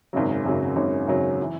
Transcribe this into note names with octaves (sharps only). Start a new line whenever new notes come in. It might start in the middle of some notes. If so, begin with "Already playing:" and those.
G#1 F#2 C#3 F#3
G#1 F#2 C#3 F#3
G#1 F#2 C#3 F#3
G#1 F#2 C#3 F#3
E3